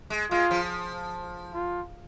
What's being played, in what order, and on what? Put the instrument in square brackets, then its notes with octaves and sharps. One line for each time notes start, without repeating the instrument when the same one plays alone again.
[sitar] G#3
[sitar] G#3 [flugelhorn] F4
[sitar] F3
[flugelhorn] F4